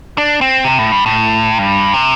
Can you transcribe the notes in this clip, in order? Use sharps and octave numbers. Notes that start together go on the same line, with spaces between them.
D4
C4
C3
A2
G2
A2
G2
C3